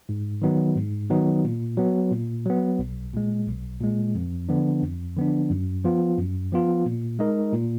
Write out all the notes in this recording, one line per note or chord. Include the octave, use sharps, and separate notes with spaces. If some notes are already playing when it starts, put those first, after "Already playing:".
G#2
D#3 F#3 B3 D#4
G#2
D#3 F#3 B3 D#4
A#2
F#3 B3
A#2
F#3 B3
B1
A#2 G#3
B1
A#2 G#3
F2
D3 F3 B3 D4
F2
D3 F3 B3 D4
F#2
F3 B3 F4
F#2
F3 B3 F4
A#2
G#3 D#4 A#4 D#5
A#2